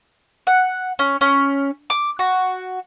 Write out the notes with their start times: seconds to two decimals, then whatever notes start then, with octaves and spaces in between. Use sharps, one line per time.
0.47 F#5
0.99 C#4
1.21 C#4
1.90 D6
2.19 F#4